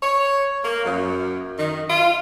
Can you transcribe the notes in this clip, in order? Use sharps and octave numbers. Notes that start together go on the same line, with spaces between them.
C#5
A#3
F#2
D#3
F4